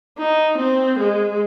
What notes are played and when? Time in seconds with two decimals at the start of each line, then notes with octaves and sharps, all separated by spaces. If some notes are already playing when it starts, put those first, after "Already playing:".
0.18 D#4
0.58 C4
1.00 G#3